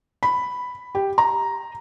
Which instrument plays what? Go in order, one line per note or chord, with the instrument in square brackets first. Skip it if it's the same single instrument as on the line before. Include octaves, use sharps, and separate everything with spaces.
[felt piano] B5
G4
A#5